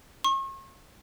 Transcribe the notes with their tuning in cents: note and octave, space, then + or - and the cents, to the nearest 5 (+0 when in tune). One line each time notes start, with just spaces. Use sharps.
C#6 -40